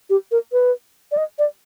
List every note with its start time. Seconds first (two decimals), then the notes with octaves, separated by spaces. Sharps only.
0.10 G4
0.31 A#4
0.52 B4
1.11 D5
1.17 D#5
1.38 D5